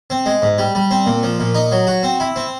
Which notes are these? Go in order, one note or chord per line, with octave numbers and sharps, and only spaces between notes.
C4
G#3
G#2
G3
G3
C4
A#2
F3
A#2
D#4
F#3
F#4
C4
E4
C4